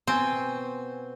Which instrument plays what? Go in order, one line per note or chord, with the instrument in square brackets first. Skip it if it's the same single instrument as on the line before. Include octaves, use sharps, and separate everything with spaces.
[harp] B2 G#5 [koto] C4